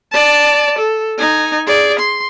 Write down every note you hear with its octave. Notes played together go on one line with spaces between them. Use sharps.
D5 A5
A4
D#4 G#5
G#4 D5
C6